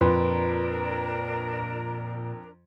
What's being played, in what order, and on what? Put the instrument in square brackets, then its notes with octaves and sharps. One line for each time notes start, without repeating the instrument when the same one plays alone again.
[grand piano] F2 [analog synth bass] A#2 [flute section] D4 A#4 A#5 [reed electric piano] B4 C6